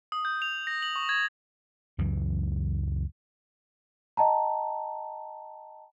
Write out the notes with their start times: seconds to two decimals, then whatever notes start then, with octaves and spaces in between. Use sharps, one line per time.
0.12 D#6
0.25 G6
0.42 F7
0.67 A#6
0.82 F#7
0.96 C#6
1.09 G#6
1.98 C#2 F#2 E3
4.17 D#5 G5 A5 A#5